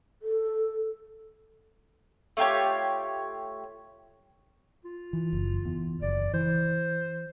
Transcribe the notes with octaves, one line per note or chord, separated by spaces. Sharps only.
A4
A3 F4 G4 C#5
F4
E3
F#1
E2
F#1 D5
E3 C5